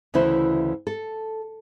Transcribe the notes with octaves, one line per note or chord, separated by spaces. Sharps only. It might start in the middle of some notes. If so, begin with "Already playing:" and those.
D2 C#3 E3 E4 C5
A4